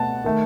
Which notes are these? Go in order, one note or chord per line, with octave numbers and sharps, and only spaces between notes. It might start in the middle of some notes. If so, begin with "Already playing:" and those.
Already playing: B2 A3 F#5 A5
D#3 A3